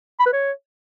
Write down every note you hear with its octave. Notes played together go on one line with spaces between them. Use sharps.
B5
B4
C#5